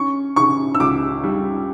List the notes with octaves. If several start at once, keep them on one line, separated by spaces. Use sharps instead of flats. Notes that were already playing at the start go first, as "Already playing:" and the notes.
Already playing: C#4 C#6
C#3 C#6
E6
C#2 D6
G3